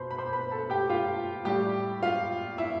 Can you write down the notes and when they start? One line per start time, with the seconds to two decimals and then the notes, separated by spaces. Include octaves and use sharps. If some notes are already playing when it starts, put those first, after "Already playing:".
Already playing: B2 B4 C5 B5 C6
0.11 B5
0.18 C5 C6
0.33 B4 B5
0.51 A4 A5
0.70 G4 G5
0.89 F4 F5
1.45 A2 G3 G4 G5
2.02 F4 F5
2.58 E4 E5